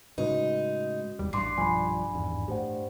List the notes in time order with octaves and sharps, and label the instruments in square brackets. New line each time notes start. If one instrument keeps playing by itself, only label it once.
[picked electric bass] A2 C#3 G#3 [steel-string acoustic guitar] D#4 [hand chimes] F#4 B4
[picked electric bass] F1 D#2 G3
[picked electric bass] A1 [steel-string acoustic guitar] G2 [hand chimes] C6 D6 C7
[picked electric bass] B1 F3 G3 [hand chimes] G#5 B5
[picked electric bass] G#1 E2
[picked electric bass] A2 [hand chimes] G4 C5 F#5